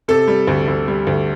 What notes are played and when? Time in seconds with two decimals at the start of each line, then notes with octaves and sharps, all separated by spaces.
0.08 C3 A4
0.28 G3
0.48 D2
0.68 D2
0.88 G3
1.07 D2